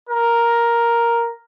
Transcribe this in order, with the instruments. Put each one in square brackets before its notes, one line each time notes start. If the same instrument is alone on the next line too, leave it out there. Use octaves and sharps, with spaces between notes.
[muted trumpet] A#4